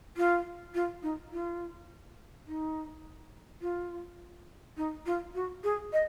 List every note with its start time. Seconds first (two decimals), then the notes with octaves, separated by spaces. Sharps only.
0.17 F4
0.74 F4
1.03 D#4
1.32 F4
2.47 D#4
3.62 F4
4.77 D#4
5.06 F4
5.35 F#4
5.64 G#4
5.93 D#5